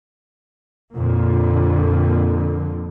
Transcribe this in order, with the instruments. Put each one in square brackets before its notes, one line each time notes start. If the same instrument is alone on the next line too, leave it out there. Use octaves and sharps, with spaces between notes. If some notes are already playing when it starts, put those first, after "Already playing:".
[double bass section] F2 A#2 D3